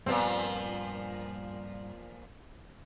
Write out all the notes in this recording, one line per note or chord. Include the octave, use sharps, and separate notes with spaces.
G2 A#2 F3 B3 C4